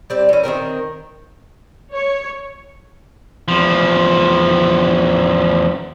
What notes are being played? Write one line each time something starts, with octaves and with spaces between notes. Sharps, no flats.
G3 C4 D5
E3 C#4
D#3 G#3 C4 A#4
C#5
E2 F3